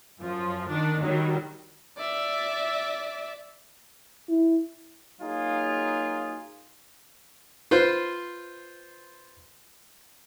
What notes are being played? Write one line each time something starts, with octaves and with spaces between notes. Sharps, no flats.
F#2 F3
D#3 D4
D#3 F#3 G3
D5 E5
E4
F#3 A#3 D#4 F4 G#4
F4 B4 C5